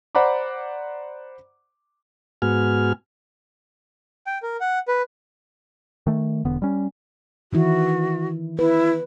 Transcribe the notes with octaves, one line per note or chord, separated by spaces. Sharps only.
C5 D5 F#5 A#5 B5 D6
G#2 B3 F#4 G#5 F6
G5
A#4
F#5
B4
D#3 A3
E1 D3 B3
G3 C#4
D#3 E3 E4 F#4
E4 B4